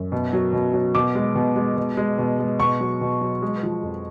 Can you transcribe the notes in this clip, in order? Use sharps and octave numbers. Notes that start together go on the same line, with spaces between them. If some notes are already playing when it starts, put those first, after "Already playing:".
Already playing: F#2
B2
F#3
B2
F#3
B2 D6
G#3
B2
G#3
B2
G#3
B2
G#3
B2 C#6
F#3
B2
F#3
G#3
F3
F2